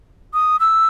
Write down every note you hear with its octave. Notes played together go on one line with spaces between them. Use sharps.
D#6
E6